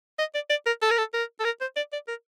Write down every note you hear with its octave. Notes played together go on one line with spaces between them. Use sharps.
D#5
D5
D5
A#4
A4
A#4
A4
A#4
A4
A#4
C5
D5
D5
A#4